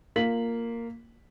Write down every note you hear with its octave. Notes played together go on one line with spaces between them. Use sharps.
A#3 F4 F5 B6 F#7